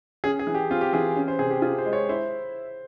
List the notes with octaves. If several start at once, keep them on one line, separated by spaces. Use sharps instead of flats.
C#4 G#4
G#4
E3
G4
C4 F4
G4
E3 G#4
C#4
C5
C3 G#4
G4
F4 G#4
C5
G#3
C#5
E4 C5